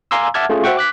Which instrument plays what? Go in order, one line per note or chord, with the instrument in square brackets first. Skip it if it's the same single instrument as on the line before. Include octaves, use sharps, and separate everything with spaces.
[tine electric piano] F5 G#5 A#5 C6 D6 E6
E5 F#5 A5 D6 F6 G#6
A3 C#4 F4 G#4
F#4 C5 E5 F#5 G5 C#6
D6 F#6 B6